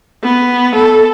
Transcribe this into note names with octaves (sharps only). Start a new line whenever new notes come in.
B3
A4